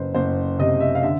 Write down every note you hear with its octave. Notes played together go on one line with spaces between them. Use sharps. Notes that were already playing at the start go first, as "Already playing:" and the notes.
Already playing: F#1 B4 C5
F#1 C5
C3 D#5
E5
F5
D3 E5